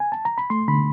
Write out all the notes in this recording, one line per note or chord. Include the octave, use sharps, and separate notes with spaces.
G#5
A5
A#5
B5
A3 C6
D3 B5